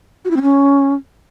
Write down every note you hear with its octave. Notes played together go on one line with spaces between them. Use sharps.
F#4
E4
C4
C#4